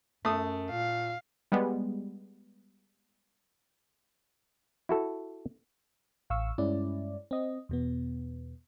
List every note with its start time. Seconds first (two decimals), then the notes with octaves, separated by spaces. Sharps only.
0.25 F#2 A3 D#6
0.71 A#2 F5
1.52 G3 G#3 B3
4.89 E4 F#4 A4
6.30 A1 F5 C#6 E6
6.58 G2 G#3 C#4 E4 D5
7.31 C4 D#5
7.69 E2 B2 B3